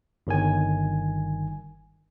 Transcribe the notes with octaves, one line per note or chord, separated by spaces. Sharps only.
G1 D#3 G#5